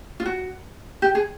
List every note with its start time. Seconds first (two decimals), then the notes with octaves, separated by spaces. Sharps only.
0.20 F4
0.26 F#4
1.02 G4
1.15 G#4